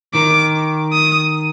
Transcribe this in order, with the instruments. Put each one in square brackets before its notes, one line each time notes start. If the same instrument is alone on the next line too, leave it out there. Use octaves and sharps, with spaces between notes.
[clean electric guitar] D#3 [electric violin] D6
[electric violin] D#6